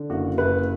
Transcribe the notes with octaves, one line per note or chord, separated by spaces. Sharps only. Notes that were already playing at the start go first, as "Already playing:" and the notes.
Already playing: D3
F#1 F#4
F#1 B4